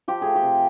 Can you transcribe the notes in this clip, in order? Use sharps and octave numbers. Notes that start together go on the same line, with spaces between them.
F3 G4
A3 G#4
G4
C3